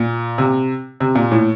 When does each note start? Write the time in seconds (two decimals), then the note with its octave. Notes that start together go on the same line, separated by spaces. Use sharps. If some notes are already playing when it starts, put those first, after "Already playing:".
Already playing: A#2
0.38 C3
1.00 C3
1.15 A#2
1.32 A2